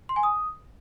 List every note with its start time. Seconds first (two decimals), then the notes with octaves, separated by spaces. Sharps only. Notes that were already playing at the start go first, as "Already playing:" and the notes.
0.09 C6
0.16 G#5
0.23 D#6